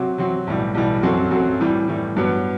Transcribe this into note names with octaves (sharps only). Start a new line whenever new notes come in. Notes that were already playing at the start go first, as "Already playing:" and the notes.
Already playing: C3 F#3 C4 F#4
C3 F#3 C4 F#4
B1 A2 E3 G3
B1 A2 E3 G3
F#2 F#3 C4 F#4 A4
F#2 F#3 C4 F#4 A4
A2 E3 G3
A2 E3 G3
G2 F#3 B3